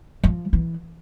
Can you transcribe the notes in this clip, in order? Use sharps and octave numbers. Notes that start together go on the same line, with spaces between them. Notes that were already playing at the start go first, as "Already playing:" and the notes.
F3
E3